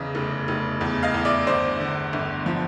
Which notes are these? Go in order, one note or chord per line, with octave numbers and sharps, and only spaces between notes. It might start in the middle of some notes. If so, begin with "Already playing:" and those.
Already playing: E2 C#3 E3 D#5
F1
F1
E2
D#5 F5
E2
D5 E5
G1 C5 D5
D3
G1
F3